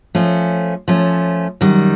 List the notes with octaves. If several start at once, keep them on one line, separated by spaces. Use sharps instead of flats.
F3 A3 C#4
F3 A3 C#4
F#2 D#3 G3